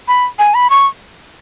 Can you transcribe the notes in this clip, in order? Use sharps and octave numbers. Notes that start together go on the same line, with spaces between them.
B5
G#5
B5
C#6